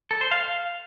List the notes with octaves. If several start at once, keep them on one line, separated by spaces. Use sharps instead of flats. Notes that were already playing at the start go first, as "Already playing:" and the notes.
A4
C5
F5